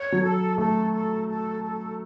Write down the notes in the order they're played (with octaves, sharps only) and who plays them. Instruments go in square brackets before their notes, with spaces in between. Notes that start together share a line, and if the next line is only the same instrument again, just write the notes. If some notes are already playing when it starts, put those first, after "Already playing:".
Already playing: [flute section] C#5
[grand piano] F#3
[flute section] A4
[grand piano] A3 [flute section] A4
[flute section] A4
A4
A4